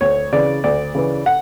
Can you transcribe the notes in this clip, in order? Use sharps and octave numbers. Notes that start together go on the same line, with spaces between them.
D2 C#5
C#3 E3 D5
D2 D5
C#3 E3
F#5